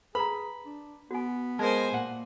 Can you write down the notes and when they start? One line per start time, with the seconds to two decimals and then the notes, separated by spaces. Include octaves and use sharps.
0.15 G#4 B4 A#5 B5
0.66 D4
1.11 B3 F#4 G#5
1.59 G#3 A#4 C5 G#5 A5
1.94 A#2 F#5